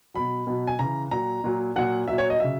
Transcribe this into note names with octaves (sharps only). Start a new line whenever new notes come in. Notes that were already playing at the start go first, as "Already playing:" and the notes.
B2 F#3 B5
B2 F#3
G#5
C#3 E3 A#5
A#2 F#3 A#5
A#2 F#3
A#2 F#3 F#5
A#2 F#3 E5
C#5
D#5
C#3 F#3 E5